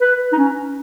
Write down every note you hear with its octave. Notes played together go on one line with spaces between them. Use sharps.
B4
D#4
C#4